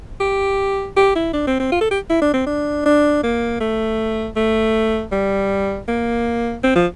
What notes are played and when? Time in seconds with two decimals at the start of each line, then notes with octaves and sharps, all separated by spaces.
0.21 G4
0.97 G4
1.15 E4
1.34 D4
1.47 C4
1.60 C4
1.72 F4
1.81 A4
1.91 G4
2.10 E4
2.22 D4
2.34 C4
2.46 D4
2.86 D4
3.23 A#3
3.60 A3
4.36 A3
5.12 G3
5.88 A#3
6.64 C4
6.75 F3